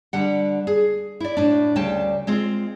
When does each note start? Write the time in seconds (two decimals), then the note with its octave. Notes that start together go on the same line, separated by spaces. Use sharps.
0.13 D3 G3 F#5
0.67 G#4
1.20 E4 D5
1.37 A2 D4
1.76 D2 C#3 G3 G5 A5
2.27 G#3 C4 F4